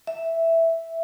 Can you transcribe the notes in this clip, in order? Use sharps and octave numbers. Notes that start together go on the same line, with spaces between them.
E5